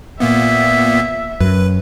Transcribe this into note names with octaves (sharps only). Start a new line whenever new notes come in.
A#2 A#3 B3 E5
F#2 B4